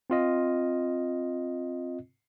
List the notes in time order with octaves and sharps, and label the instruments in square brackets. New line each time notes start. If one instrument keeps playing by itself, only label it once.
[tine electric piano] C4 F4 D#5